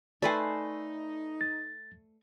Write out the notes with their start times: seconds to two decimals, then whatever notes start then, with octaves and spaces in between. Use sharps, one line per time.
0.22 A3 D#4 B4 C5 D5 G#5
1.41 A6